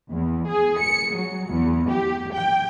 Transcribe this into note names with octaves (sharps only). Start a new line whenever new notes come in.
E2
G#4
C#7
F#3
E2
G4
G5